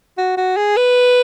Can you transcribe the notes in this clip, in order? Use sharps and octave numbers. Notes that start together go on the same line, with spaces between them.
F#4
F#4
G#4
B4